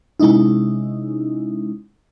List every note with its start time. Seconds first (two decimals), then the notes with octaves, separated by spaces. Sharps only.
0.20 C3 G#3 C#4 D#4 E4